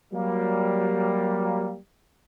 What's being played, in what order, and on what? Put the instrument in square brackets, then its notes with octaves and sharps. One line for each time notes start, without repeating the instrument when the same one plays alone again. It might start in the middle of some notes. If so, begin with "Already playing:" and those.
[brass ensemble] F#3 G3 A#3